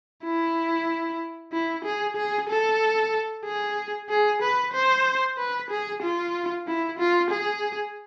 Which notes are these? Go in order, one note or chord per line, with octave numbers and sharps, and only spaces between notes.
E4
E4
G#4
G#4
A4
G#4
G#4
B4
C5
B4
G#4
F4
E4
F4
G#4